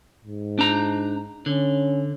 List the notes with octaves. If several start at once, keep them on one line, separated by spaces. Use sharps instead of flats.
G#2
D4 A#5
D3 C#4